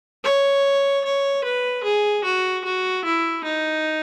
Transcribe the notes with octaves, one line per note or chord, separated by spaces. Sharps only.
C#5
C#5
B4
G#4
F#4
F#4
E4
D#4